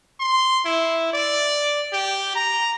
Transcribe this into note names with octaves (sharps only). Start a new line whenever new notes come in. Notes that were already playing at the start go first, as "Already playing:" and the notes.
C6
E4
D5
G4
A#5